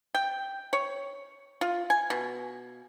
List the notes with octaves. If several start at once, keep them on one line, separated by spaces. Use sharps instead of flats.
G5
C#5
F4
G#5
B2